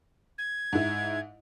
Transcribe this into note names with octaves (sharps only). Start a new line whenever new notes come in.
G#6
G#2 E4